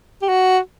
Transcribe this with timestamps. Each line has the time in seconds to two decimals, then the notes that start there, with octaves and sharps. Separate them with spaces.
0.22 G4
0.28 F#4